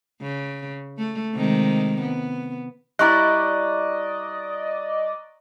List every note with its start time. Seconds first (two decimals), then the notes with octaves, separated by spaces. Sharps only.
0.22 C#3
0.98 A3
1.34 C3 D#3 G#3
2.01 B3
2.99 G3 E4 D5 D#5 A#5 C#6 F#6